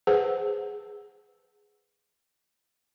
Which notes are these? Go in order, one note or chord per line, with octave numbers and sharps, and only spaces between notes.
G#4 B4 C5 F#5